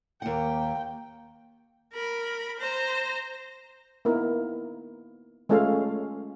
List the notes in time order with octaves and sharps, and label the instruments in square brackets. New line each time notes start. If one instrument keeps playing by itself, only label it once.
[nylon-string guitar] D#2 F#5 [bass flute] A#3 [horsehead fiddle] G5
[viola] A#4 B5
C5 A#5
[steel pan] A#3 B3 D#4 E4 A#4
G#3 A3 C#4 F4 A4 F5